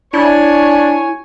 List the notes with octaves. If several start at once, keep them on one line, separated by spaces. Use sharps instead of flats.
D4 E4 C#5 G#5